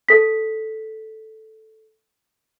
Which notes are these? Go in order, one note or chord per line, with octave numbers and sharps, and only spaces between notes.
A4 B6